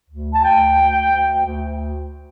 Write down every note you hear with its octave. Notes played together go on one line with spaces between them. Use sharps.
D2
A5
D2 G5
D2
D2
D2